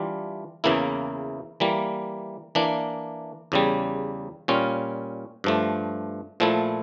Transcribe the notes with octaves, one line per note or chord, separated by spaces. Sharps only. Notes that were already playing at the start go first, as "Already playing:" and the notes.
Already playing: E3 G3 D4 F4
E2 C#3 E3 A#3 E4
E3 G3 A#3
E3 A#3 D4
E2 C#3 G3
A#2 G3 C#4 F4
G2 F3 A3
A#2 F3 A3 E4